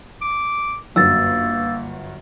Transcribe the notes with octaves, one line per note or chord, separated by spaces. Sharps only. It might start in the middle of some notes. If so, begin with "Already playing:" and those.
D6
G1 F#2 A#3 E6 A6